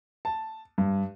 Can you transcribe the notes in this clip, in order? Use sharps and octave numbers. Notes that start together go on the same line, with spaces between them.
A5
G2